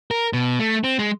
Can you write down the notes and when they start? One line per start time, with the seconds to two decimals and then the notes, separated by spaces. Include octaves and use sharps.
0.11 A#4
0.33 B2
0.60 A3
0.84 C4
0.99 G#3